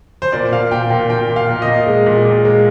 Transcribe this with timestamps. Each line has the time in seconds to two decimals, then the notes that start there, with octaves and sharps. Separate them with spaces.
0.22 C5
0.32 A#2 D5
0.52 A#2 F5
0.71 A#2 G5
0.90 A#2 G5
1.10 A#2 G5
1.30 A#2
1.36 F5
1.49 A#2
1.62 D#5
1.68 A#2
1.87 G#3
2.06 A#2
2.25 A#2
2.45 G#3